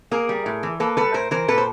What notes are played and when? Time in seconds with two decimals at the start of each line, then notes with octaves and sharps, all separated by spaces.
0.11 A#3 G#4 A#4
0.29 G3
0.46 A2
0.63 E3
0.80 A#3 A4 B4
0.97 G3 A4 B4
1.14 A2 A#4 C5
1.31 E3 A#4 C5
1.48 A#2 A4 B4
1.58 C5